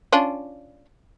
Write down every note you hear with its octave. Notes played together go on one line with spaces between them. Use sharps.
C#4 D4 F4